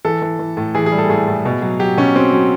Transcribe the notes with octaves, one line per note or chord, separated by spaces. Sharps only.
E3 A4
E3
E3
A2
E3 G#4
G#4
G3
A4
A2 G#4
A2
B2
F#3
F#3 G4
B2 C#4
F#3 C4
F#3